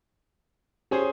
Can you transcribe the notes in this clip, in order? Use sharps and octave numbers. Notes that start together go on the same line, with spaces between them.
C#4 G4 G#4 C5